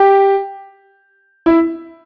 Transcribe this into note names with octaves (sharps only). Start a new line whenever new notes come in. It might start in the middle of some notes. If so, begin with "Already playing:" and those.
Already playing: G4
E4